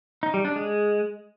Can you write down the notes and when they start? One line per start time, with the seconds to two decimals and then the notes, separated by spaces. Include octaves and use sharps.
0.23 D#4
0.34 G3
0.45 D4
0.56 G#3